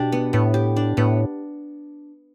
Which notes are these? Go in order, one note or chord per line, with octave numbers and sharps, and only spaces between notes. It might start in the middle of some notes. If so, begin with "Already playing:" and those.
Already playing: B2 D4 G4
B3
A2 B3
G4
D4
A2 B3